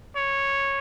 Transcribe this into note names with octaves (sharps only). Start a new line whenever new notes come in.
C#5